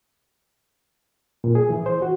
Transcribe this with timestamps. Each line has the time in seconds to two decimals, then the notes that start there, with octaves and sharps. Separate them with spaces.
1.44 A#2
1.55 G#4
1.70 E3
1.86 C5
2.02 F#4